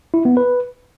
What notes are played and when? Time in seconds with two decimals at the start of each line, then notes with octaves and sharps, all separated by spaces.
0.14 E4
0.25 B3
0.37 B4